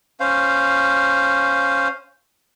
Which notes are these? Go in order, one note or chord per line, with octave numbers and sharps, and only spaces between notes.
C#4 C5 F5